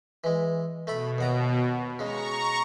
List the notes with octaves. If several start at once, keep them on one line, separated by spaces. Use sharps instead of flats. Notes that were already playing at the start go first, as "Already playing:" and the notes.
E3 G#3
B2 A3 A4 B5
D#2 F#5 A#5
C#3 G#3 A#5 C#6